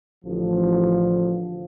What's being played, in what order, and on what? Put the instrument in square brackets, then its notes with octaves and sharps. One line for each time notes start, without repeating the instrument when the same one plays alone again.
[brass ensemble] A1 D3 F3